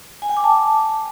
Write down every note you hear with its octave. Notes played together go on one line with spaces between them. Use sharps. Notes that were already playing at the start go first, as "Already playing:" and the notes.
G#5
G5
D6
A5